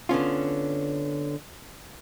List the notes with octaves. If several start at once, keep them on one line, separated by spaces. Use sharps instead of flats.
D3 B3 C#4 F4